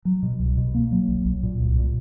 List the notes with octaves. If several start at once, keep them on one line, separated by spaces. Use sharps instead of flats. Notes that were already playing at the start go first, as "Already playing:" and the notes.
F#3
B2
C2
B2
A#3
F#3
B1
B1
A#2
C2
A#2